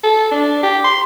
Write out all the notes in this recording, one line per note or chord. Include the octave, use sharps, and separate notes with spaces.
A4
D4
G4
C6